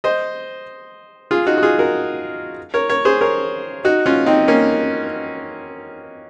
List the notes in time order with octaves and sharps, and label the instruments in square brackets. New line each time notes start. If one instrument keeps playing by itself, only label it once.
[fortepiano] C5 D#5
F4 G#4
D#4 F#4
F#4
F4 G#4
F#4 A#4
A#4 C#5
A#4 C#5
G#4 C5
A#4 C#5
D#4 F#4
C#4 F4
C4 D#4
A#3 C#4